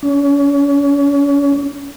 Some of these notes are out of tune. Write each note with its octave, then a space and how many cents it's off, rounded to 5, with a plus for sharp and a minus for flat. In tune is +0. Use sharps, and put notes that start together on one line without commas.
C#4 +35